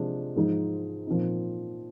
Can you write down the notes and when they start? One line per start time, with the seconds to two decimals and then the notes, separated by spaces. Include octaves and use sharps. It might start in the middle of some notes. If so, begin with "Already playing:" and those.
Already playing: C3 F3 G#3 D4
0.36 G#2 F3 G#3 D#4
1.07 A#2 F3 C4 D#4